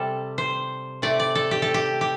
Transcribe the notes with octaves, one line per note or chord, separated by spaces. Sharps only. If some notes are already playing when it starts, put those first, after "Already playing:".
Already playing: C3 G3 A4
C5
C3 A3 D5
D5
A4
G4
A4
G4
G4